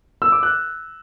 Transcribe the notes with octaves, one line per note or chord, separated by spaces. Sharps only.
E6
D6
F#6